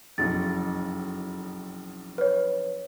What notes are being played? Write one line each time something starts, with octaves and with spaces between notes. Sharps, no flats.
F#1 B1 F2 A6
B4 C#5